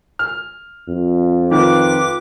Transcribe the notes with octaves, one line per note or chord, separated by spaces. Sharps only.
F6
F2
D#3 F4 B4 D6